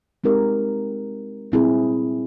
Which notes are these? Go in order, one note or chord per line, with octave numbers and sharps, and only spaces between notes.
G#3 C4 D#4 G4 A#4
A#2 G3 C4 E4 G#4